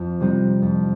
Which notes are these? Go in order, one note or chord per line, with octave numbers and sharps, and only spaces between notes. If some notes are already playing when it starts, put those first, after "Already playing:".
Already playing: F2
C3 G3 C4 D#4
F2